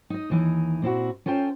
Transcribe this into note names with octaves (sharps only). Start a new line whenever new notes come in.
D#4 D#5
D#2 E3 D#4
A#2 C4 E4 F#4
C#4 F4 A4 C5 G5